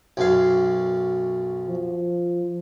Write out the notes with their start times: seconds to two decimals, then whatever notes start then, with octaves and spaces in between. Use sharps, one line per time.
0.17 B1 F#2 F5
1.68 F3